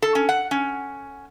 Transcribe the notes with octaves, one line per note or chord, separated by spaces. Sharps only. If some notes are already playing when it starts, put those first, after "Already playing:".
A4
C#4
F#5
C#4